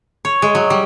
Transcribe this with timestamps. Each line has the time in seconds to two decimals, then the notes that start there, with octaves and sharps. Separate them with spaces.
0.25 C#5
0.42 G#3
0.55 F#3
0.70 G3